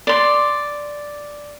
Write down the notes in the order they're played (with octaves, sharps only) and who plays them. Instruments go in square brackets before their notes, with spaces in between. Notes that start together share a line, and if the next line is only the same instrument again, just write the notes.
[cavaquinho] D5 C6